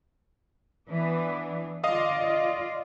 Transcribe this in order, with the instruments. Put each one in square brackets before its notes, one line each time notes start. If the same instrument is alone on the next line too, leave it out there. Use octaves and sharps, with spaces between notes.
[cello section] E3 B3 D4
[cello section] D3 F4 D5 [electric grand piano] D#5 F5 D#6
[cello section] F4 D5